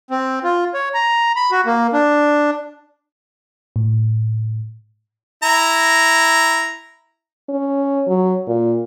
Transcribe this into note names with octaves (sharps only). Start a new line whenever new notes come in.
C4
F4
C#5
A#5
B5
F#4
A#3
D4
A2
E4 A#5
C#4
F#3
A#2